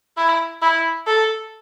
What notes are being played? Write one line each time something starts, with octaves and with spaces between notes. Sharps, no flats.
E4
E4
A4